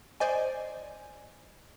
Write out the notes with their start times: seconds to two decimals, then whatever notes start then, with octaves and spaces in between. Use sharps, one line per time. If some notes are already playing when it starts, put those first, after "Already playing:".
0.20 C5 D5 D#5 G#5